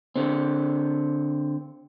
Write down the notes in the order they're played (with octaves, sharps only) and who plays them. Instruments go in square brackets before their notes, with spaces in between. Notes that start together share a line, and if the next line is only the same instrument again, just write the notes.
[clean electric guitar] D3 C4